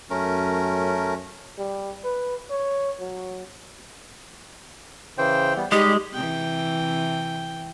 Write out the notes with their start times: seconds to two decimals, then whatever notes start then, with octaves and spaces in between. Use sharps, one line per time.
0.10 F#2 A3 C#4 A#4
1.58 G3
2.04 B4
2.50 C#5
3.00 F#3
5.18 C#3 E3 C5 G5
5.56 G3 B3
5.72 G3 G#3 D#4 G4
6.13 C3 E3 G5